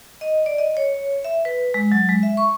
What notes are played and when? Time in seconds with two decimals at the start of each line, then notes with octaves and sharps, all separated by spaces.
0.21 D#5
0.46 D5
0.58 D#5
0.77 C#5
1.25 E5
1.45 B4
1.74 G#3
1.92 F#3
2.09 G#3
2.23 E5
2.37 C#6